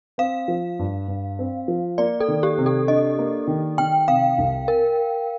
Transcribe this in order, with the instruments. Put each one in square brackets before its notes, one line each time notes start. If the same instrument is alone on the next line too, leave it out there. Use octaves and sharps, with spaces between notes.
[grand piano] C4 [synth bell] F5
[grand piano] F3
G2
G2
C4
F3
[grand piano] A#3 [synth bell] D5
[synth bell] A4
[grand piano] D#3
[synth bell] G4
[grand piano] C3
[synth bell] A4
[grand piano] D4 [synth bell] D#5
[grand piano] A#3
D#3
[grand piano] D#3 [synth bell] G5
[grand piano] C3 [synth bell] F5
[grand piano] C2
[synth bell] A#4